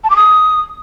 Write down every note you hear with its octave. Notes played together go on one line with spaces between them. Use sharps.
A5
D6
D#6